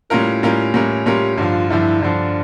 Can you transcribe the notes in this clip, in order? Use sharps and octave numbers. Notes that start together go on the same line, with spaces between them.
A2 G3 C#4 E4 F4 A#4
A2 G3 C#4 F4 A#4
A2 G3 C#4 F4 A#4
A2 G3 C#4 F4 G4 A#4
G2 D3 F3 F4
G2 D3 F3 E4
G2 D3 F3 D4